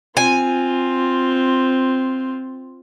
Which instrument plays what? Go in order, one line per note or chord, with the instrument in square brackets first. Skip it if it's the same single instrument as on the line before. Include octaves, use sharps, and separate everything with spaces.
[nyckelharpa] C4 F4 [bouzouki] G#5